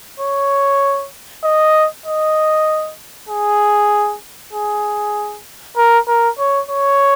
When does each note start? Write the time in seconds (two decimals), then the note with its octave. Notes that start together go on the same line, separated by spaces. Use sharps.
0.20 C#5
1.44 D#5
2.06 D#5
3.29 G#4
4.53 G#4
5.77 A#4
6.08 A#4
6.39 C#5
6.69 C#5